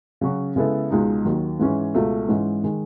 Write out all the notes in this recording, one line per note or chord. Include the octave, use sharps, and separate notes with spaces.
C#3 F#3 C#4 F#4
C#3 G#3 B3 E4 A4
C#2 B2 G#3 D#4
D#2 D#3 F#3
G#2 E3 G#3 C#4 E4
C#2 B2 A3
G#2 E3 G#3 C#4
D#3 G#3